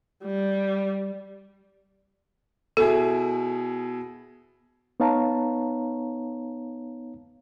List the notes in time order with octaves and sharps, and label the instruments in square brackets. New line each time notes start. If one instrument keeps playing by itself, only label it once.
[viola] G3
[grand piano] B2 E4 G#4 [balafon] A4
[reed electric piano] B3 D#4 C#5 F5 A5 A#5